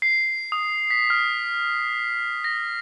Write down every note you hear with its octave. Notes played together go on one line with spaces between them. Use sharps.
C7
D#6
B6
F6
A#6